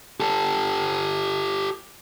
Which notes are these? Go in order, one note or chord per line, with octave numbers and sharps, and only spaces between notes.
G4 A4